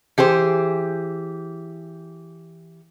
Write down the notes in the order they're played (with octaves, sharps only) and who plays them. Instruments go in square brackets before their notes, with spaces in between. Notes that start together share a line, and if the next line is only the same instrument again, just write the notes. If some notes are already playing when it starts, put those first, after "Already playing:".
[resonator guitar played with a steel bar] E3 G4 G#4 C5